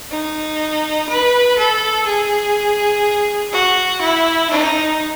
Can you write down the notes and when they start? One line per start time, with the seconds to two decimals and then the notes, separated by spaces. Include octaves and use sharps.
0.11 D#4
1.09 B4
1.58 A4
2.06 G#4
3.52 F#4
4.01 E4
4.50 D#4